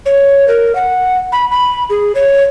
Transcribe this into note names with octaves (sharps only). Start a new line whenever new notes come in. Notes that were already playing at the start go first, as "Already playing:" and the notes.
C#5
A#4
F#5
B5
B5
G#4
C#5